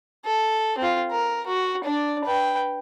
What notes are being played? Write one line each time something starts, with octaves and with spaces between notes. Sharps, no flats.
A4
C4 F4
A#4
F#4
D4 D5
B4 G5